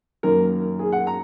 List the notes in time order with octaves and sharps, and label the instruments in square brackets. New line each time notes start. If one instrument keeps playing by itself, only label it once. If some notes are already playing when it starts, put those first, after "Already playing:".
[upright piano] F#2 D#3 A#3 A#4
G#4
F#5
A#5